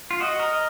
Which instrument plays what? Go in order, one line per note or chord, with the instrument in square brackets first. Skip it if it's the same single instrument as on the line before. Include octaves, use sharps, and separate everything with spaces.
[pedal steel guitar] F4
[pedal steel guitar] F#4 [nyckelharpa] D#5
[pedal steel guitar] A#4